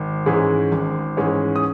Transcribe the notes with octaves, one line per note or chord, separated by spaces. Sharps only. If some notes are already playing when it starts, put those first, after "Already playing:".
Already playing: G#1
G#2 E3 G#3 C#4
G#1
G#2 E3 G#3 C#4
D#6